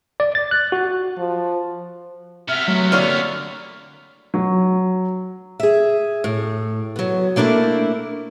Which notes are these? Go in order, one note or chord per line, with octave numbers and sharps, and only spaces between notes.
D5
A6
F#6
F#4
F3
C3 B3 E5 F6
F#3 A3
D3 A#3 C#5 D5 F6
F#3
G#4 E5
A2
F#3 B3
A3 A#3 D4 E4 A#4